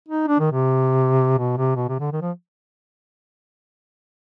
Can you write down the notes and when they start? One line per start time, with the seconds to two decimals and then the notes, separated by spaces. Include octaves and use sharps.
0.09 D#4
0.28 D4
0.40 D#3
0.52 C3
1.39 B2
1.57 C3
1.76 B2
1.89 C3
2.00 D3
2.12 D#3
2.21 F3